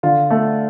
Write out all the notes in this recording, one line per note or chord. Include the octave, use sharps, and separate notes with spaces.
D3 F4
A3